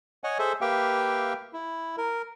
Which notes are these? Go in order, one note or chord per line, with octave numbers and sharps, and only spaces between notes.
C#5 D#5 F#5 G#5
G#4 A4 C5 E5
A#3 G4 B4 E5 F5 G5
E4
A#4